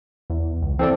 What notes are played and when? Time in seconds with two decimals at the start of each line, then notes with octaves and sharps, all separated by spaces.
0.30 E2
0.62 C#2
0.79 E3 C4 A4 D5